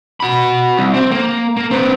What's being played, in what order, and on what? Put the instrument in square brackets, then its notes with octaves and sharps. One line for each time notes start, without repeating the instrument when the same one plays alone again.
[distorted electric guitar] F#4 B5
C2
C4
A#3
A#3
C4 B4